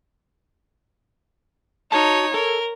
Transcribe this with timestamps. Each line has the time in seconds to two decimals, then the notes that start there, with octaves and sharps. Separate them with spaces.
1.92 D#4 F#4 C#5 A5
2.34 A4 A#4